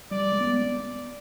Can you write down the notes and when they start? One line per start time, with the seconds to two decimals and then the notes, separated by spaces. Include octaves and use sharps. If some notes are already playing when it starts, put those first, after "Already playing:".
0.11 G3 D5
0.33 G#3
0.41 B3